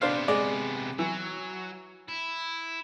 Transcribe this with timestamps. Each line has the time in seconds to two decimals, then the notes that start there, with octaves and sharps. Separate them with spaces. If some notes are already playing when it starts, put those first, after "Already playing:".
0.02 C3 B3 D4 C5 F5
0.28 G#3 D5
0.99 E3 F#3
2.08 E4